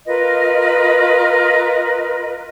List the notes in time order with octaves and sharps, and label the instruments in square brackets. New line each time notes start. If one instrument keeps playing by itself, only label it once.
[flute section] F4 A#4 B4 D#5